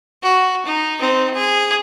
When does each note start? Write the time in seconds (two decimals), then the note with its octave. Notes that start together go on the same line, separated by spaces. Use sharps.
0.22 F#4
0.66 D#4
1.00 C4 D#4
1.34 G#4